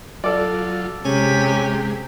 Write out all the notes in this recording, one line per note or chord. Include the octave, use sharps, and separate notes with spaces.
F#3 F4 A4 D5
C3 G#3 C#4 G4